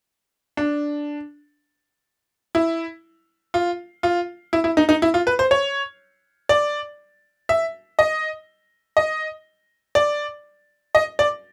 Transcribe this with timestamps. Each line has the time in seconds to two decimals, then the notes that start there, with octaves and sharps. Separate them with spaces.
0.57 D4
2.55 E4
3.54 F4
4.03 F4
4.53 E4
4.64 E4
4.77 D#4
4.89 D#4
5.02 E4
5.14 F4
5.27 B4
5.39 C5
5.51 C#5
6.49 D5
7.49 E5
7.99 D#5
8.97 D#5
9.95 D5
10.95 D#5
11.19 D5